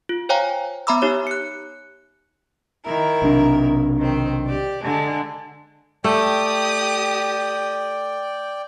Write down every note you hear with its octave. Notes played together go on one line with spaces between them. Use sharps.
F4
C5 C#5 F5 G5 G#5 A#5
B3 E5 A#5 B5 D6 E6
D#4 G4 C#5
F#6 C#7
D#3 E4 A#4
B1 C3 D4
D#3 C4
G4 D5
D3 G#3 D4
A3 G4 D5 G5 D#6